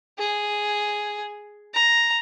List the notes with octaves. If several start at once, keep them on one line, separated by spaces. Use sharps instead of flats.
G#4
A#5